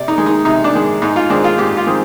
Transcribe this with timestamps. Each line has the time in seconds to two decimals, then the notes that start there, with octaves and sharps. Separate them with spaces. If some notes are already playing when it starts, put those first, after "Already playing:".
Already playing: C3 D5
0.08 D#4
0.18 D#3 G#3
0.26 D#4
0.45 C3 D#4
0.64 D4
0.74 D#3 G#3
1.02 G#2 D#4
1.16 F4
1.30 D#3 G#3 C4 D4
1.44 F4
1.58 G#2 G4
1.77 F4
1.86 D#3 G#3 C4